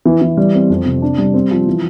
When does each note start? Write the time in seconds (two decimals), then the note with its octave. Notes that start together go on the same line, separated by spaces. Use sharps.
0.05 E3
0.21 E3
0.37 G3
0.54 C4
0.70 F2
0.85 C3
1.02 D4
1.18 G3
1.34 C4
1.51 F3
1.67 E3